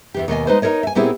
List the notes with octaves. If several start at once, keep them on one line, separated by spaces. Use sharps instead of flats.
E2 E3 G4
D#2 B2 D#5 G#5
G#3 D#4 B4 C5
D#4 E4 A#4 C#5 D#5
E5 G#5
A#2 B3 C4 E4 G4 G#4